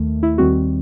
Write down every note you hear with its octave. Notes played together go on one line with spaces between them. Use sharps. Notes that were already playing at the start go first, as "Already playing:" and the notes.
Already playing: D#2 D#3 A3
E4
D#2 D#3 G3 C4 F#4